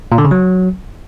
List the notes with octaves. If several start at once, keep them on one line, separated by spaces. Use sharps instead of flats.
A#2
D3
C#3
F#3